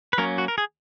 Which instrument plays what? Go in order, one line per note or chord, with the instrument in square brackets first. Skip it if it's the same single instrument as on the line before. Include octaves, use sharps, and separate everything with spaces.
[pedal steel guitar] B4
F#3 A#3 C#4 A#4
F#4
A#4
G#4